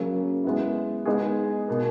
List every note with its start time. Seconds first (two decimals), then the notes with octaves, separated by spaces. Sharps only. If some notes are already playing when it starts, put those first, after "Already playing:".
Already playing: C#3 F#3 A#3
0.44 G#3 B3 E4
1.06 G#3 B3 D#4 G#4
1.68 B2 A#3